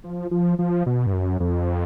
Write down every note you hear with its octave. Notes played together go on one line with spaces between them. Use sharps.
F3
F3
F3
B2
G2
F#2
F2